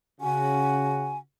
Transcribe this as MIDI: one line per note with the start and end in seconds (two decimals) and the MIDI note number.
0.21 1.18 49
0.21 1.18 66
0.21 1.18 80